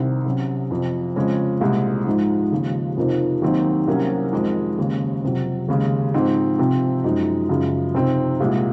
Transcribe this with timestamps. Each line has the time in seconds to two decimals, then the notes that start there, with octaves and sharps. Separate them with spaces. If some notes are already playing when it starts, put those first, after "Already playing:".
Already playing: C2 C3 D#3
0.26 C3 F#3 C#4
0.71 F2 C3 F3
1.16 F2 C#3 G#3 C#4
1.61 C2 A#2 G#3
2.07 G#2 F3 G#3 D#4
2.52 D#2 C#3 F3 G#3
2.97 F2 C3 F3 A#3 D#4
3.42 D#2 D#3 F#3 C4 D#4
3.87 C2 C3 F#3 A#3 C#4
4.33 F2 D#3 G#3
4.78 D#2 C#3 G#3 C#4
5.24 F2 C3 F#3
5.68 D#2 C#3 G#3
6.14 G#2 F3 C4 D#4
6.59 C3 F3 C4
7.04 F#2 F3 G#3 D#4
7.49 F#2 C#3 F3 G#3
7.95 C3 F3 C4 D#4
8.40 C2 A#2 G#3